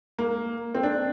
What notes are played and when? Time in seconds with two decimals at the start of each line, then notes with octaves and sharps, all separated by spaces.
0.19 A#3
0.75 C4
0.83 D4